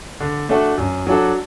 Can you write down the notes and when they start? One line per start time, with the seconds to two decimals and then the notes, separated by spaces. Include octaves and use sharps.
0.20 D3
0.49 A3 D4 F#4 A4
0.78 F#2
1.07 F#3 D4 F#4 A4